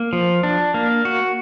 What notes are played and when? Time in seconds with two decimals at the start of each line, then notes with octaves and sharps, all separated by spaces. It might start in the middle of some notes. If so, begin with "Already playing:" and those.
Already playing: A#3
0.13 F3
0.43 D4
0.74 A#3
1.05 F#4